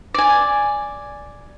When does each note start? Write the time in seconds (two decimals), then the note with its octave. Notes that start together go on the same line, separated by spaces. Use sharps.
0.14 D5 G#5